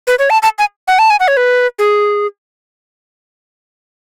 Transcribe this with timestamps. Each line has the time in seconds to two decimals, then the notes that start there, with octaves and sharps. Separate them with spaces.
0.07 B4
0.19 C#5
0.30 A5
0.43 A5
0.59 G#5
0.88 F#5
0.99 A5
1.10 G#5
1.20 F#5
1.28 C#5
1.37 B4
1.79 G#4